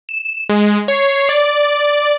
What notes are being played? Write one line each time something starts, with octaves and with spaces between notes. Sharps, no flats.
E7
G#3
C#5 C7
D5